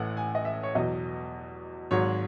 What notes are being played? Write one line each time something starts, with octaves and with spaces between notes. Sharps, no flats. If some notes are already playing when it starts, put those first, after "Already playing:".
Already playing: A1 A2 E3 F#5
G#5
D#5
E5
C#5
E2 B2 F#3 D#5
G#1 G#2 F#3 C#5